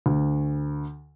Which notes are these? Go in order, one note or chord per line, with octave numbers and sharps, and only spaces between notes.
D2